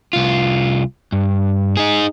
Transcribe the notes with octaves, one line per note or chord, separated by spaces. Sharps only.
C2 F4
G2
D#4 G#4